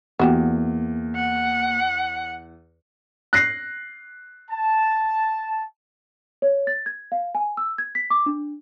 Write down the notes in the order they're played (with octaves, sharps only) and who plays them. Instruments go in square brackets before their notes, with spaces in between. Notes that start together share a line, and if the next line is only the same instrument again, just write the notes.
[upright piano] E2 [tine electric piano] A#3 [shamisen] B3 F#4 G4
[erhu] F#5
[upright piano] F#6 A#6 C7
[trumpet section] A5
[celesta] C#5
A6
G#6
F5
G#5
E6
G#6
B6
D6
D4